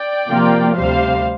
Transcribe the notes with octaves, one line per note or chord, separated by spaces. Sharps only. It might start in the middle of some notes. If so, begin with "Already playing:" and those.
Already playing: D5 G5
C3 F3 A#3 F4
D2 C3 G3 C5 F5